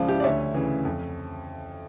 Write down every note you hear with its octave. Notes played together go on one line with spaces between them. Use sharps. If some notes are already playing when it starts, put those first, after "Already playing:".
Already playing: C#2 C#3 F3 F4 D5
E4 G4
D5
D2 C#5 E5
C#3 E3
F2